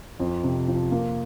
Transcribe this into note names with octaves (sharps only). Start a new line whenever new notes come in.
F2
C3
F3
A#3